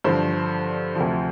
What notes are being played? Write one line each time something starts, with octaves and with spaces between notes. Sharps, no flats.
G2 D3 F3 C5
D2 C3 F3